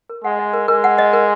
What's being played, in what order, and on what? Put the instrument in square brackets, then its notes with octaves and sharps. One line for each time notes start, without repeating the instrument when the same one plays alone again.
[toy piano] A#4
[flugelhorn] G#3 [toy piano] F#5
[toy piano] D#5
A#4
[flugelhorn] G#3 [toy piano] A#4
[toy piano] F#5
D#5
A#4